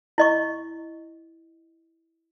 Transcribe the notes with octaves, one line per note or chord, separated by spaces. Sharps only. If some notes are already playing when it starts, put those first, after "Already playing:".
E4 D#5 C#6